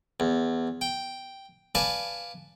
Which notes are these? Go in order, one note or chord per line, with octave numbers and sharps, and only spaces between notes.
E2
G5
B4 D5 F5 G#5 A5